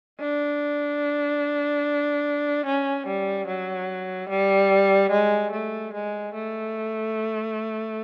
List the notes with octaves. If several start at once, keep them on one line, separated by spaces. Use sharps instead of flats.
D4
C#4
G3
F#3
G3
G#3
A3
G#3
A3